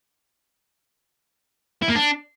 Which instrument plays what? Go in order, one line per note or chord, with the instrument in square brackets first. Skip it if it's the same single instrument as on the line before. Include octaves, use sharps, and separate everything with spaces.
[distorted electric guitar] E4
A#3
D4